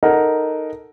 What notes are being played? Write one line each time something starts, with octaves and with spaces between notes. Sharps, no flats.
D#4 A4 A#4 F#5